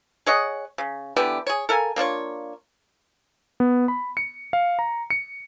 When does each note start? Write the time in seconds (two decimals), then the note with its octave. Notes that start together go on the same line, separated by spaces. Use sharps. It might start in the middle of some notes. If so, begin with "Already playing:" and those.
0.26 G#4 C#5 D#5 F#5
0.78 C#3
1.17 D3 E3 B3 G4
1.47 G#4 C#5
1.69 A4 A#4 F5 G#5
1.96 A#3 D4 F4 C#5
3.60 B3
3.88 B5
4.17 C#7
4.53 F5
4.79 A#5
5.10 C#7